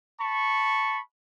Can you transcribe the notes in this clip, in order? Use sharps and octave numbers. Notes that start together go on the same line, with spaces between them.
A5 B5 C#6